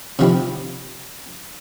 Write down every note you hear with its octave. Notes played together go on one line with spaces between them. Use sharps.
C3 F3 C4 E4